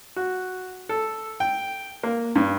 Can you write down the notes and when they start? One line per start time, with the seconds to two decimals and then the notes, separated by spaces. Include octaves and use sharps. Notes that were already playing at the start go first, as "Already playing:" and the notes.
0.16 F#4
0.89 A4
1.40 G5
2.03 A#3
2.36 G2